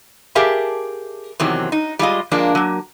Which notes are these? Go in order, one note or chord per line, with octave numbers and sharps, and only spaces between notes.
G4 G#4 A#4 E5 F5 A5
E2 C3 D#3 F#3 C4
D#4
G3 G#3 F4 D#5
F3 G#3 A#3 D4 A#4
F#3 A#3